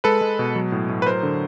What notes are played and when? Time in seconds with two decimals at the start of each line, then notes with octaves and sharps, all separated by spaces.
0.04 G#3 A4 B4
0.21 G#3
0.39 B2
0.56 F#3
0.72 A2
0.89 A2
1.02 B4
1.06 F#3 A#4 C5
1.23 D3